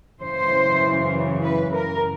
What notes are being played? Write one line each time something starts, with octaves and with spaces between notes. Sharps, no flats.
F#2 C#3 E3 C5
B4
A#4